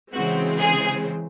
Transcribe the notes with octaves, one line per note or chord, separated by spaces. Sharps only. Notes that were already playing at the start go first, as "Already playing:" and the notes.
C#3 E3 G#3 C4 F#4
G#4